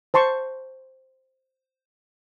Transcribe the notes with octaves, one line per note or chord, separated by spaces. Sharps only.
C5 A5 C6 C#6